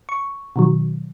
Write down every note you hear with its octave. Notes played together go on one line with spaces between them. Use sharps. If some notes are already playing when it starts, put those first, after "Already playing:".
C#6
B2 D#3 F#3